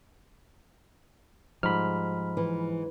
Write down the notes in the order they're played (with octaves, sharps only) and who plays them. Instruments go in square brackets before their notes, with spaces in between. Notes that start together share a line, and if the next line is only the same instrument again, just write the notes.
[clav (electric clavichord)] G#2 [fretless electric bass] F3 G3 [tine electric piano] B5 F6
[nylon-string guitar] E3